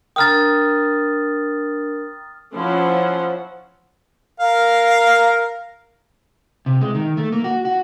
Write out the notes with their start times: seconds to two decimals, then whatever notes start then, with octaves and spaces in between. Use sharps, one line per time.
0.16 D4 A#4 G5 A#5 D#6 F6 A6
2.53 F3 C#4 E4 F#5
4.40 A#4 F5
6.66 C3
6.81 G#3
6.95 D#3
7.17 A3
7.32 A#3
7.44 F#4
7.65 F#4